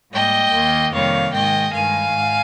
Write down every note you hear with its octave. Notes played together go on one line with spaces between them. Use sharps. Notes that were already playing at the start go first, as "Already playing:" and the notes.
G#2 G3 A#3 D#5 G5
D#2 D#3 A#3
F2 C3 D#3 G3 A#3 C#5 F5
G#2 D#3 G#3 D#5 G5
G2 D#3 G#3 F5 G#5
G#2